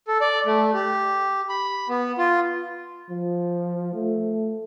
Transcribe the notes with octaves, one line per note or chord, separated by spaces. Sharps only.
A4
D5
A3
G4
B5
B3
F4
F3
A3